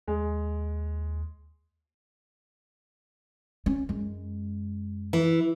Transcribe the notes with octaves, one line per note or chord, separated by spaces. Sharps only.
D#2 G#3
C#4
F#2 G#3
E3